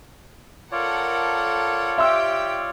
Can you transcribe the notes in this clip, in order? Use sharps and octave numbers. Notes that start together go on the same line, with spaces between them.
F4 A4 A#4 C#5 D5 F#5
G4 E5 G5 C6 E6